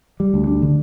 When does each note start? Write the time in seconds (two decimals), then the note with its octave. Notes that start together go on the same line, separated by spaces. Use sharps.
0.20 G3
0.34 D2
0.47 D4
0.62 D3